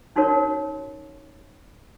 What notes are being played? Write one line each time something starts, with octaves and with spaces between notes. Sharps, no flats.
C#4 D#4 F#4 A#4 C#5